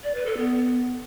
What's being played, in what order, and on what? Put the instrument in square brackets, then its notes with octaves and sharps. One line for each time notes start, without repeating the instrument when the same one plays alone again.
[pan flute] D5
B4
A4
B3